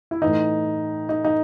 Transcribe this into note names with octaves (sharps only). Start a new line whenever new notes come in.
E4
A2 E3 D#4
D#4
D#4